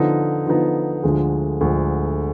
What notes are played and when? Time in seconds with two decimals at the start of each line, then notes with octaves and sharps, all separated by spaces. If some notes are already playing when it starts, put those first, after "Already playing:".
Already playing: D3 F3 B3 D#4
0.47 D3 F3 B3 D#4
1.03 D2 D3 F3 G#3
1.61 D2 D3 F3 G#3